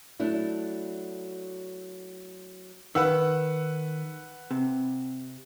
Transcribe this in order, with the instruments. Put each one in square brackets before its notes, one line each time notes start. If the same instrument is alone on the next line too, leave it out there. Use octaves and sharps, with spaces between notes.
[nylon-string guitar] F#3 A3 D4 E4
[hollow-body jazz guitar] D#3 [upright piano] B4 F#5 E6
[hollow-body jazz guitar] C3